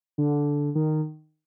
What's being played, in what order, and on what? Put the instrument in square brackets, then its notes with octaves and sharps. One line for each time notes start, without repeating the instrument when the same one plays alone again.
[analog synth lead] D3
D#3